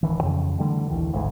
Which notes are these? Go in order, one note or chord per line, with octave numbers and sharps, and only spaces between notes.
D1 D#3 E3
F2 C#3
D3 E3 G3 A3
A#1 D#2 E3
G#1 D2 G#2